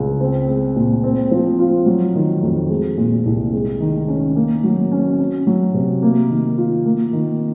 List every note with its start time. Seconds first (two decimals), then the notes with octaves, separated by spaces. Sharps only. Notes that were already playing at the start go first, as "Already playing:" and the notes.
Already playing: C#2
0.20 C4
0.48 G#3
0.76 A#2
1.04 C4
1.31 F3
1.59 F4
1.86 F#3
2.15 D#3
2.42 F2
2.70 G#3
2.97 A#2
3.26 C2
3.53 G#3
3.80 D#3
4.08 C#4
4.36 A#3
4.64 F#3
4.92 C#4
5.19 C#4
5.47 F#3
5.74 C3
6.02 A#3
6.30 D#3
6.58 F4
6.86 A#3
7.13 D#3